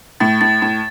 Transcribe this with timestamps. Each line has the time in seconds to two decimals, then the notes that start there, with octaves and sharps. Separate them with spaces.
0.20 A2 A6
0.41 A2 A6
0.62 A2